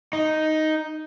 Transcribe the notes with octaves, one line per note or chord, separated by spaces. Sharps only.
D#4